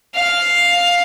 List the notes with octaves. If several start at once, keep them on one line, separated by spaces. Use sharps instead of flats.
F5